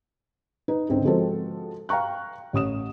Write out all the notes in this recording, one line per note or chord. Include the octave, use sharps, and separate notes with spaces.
D#4 B4
C#2 G#2 D3 C4
F3 G#3 C4 F#4 A4 C5
F5 G5 A#5 C#6 F#6
A1 C#5 D#6 E7